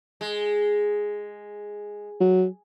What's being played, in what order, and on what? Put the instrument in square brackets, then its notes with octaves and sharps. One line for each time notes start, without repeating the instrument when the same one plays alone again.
[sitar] G#3
[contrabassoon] F#3